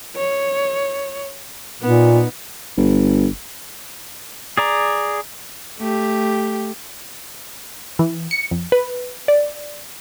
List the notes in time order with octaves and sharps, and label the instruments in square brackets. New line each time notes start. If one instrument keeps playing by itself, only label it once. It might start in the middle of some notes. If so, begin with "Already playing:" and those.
[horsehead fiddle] C#5
[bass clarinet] A#2 [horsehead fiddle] B3 D#4
[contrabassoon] G1
[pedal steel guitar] G#4 D5 A#5
[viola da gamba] A3 G4
[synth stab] E3
C#7
F2
B4
D5